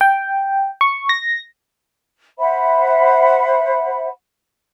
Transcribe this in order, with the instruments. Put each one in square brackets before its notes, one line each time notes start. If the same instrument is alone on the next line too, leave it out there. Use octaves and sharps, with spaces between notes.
[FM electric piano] G5
C#6
A#6
[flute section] C5 E5 F#5 B5